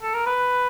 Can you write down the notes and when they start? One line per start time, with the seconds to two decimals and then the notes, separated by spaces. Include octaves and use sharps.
0.02 A4
0.14 A#4
0.26 B4